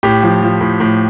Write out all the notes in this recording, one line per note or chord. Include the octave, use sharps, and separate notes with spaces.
A2 G4
F3
F3
A2
A2